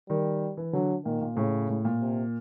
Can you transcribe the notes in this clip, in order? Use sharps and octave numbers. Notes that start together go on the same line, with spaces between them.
D#3 G3
E3
D3 F#3
A#2 D#3
A#2
A2 C#3
A2
A#2
C3